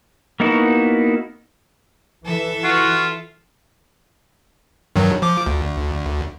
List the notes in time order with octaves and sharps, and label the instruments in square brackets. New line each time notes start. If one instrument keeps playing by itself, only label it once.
[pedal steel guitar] A#3 B3 D#4 E4 F#4
[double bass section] E3 [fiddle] A4 E5
[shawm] F4 [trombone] F#4
[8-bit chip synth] G2 D#3 F#3
F3 D6
D2